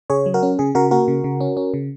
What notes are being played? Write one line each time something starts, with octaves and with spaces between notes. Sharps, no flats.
C#3 G#4 C#5
F#3
F#4 A#4
C#4
C#3 G#4
C#3 F#4 A#4
A#3 F#4 A#4
C#3
C#3
C#4
C#4
C#3